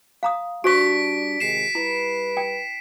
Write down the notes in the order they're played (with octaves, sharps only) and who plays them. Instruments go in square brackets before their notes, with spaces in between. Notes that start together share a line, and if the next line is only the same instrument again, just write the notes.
[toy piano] F5 A#5 D#6
[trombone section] G3 D4 [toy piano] F#4 C5 C#6 [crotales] B6 D7
[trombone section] C3 D#3 G#3 [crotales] C7 E7
[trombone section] G3 B4 [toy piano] E4
[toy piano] G5